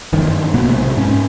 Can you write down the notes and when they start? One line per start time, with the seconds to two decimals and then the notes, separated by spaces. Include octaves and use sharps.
0.13 F#1 G2 D#3
0.54 B2 A#3 B3
0.67 B1 C3 G#3
0.97 G#2 C#4